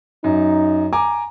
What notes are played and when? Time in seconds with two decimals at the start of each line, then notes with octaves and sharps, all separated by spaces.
0.24 F#2 D#4
0.93 G#5 A#5 D6